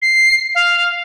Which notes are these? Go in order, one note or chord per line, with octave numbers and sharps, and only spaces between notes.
C7
F5